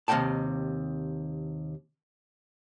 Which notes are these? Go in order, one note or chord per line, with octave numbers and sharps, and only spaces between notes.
D#2 C3 D#5 F5 G5 A5